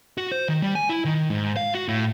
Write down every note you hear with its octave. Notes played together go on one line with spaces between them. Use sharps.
F#4
C5
D#3
G3
G#5
E4
D#3
G#2
F5
F#4
A2